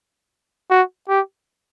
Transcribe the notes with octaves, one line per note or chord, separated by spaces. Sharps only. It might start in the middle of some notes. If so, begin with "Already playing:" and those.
F#4
G4